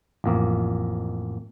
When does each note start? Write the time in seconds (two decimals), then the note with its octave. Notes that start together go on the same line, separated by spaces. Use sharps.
0.24 A1 F2 A#3